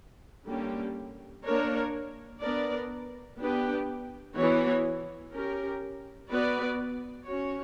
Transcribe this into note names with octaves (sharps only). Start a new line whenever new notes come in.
D3 G3 A#3 C#4 G4
A#3 D4 A#4 C#5
B3 D4 A#4 D5
B3 D4 G4 B4
E3 B3 F#4 C#5
C#4 G4 A#4
B3 F#4 B4 D5
C#4 F#4 C#5